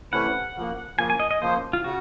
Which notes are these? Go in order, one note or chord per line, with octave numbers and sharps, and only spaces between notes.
C3 E3 A3 C#4 E4 F#5
C#3 F3 A#3
C#3 F3 A#3 G#5
G#5
D#5
D#5
C#3 F3 A#3 C5
F4
C#3 F#4